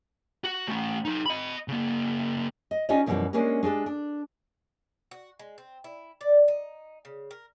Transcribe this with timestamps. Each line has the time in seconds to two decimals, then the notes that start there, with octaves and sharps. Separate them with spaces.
0.44 F#4
0.68 A3 C#4
1.05 D#4 A4
1.26 D#5 B5
1.68 C#3 A#3
2.71 D#5
2.89 C#4 D#4 F4 G4 D5 D#5
3.06 F#2 B2 E3 F3 G3 B3
3.33 G#3 A#3 C#4 D4 G4 A#4
3.63 G#3 D4 G4 A4
3.86 D4
5.11 F#4
5.39 G#3
5.58 C4
5.84 E4
6.21 D5
6.48 D#4
7.05 C#3
7.31 A#4